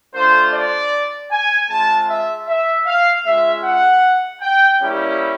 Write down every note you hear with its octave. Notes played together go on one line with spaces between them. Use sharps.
A3 D4 F4 C5
D5
G#5
G#3 C4 F4 A5
E5
E5
F5
G#3 C#4 F4 E5
F#5
G5
G3 A#3 C#4 E4 G4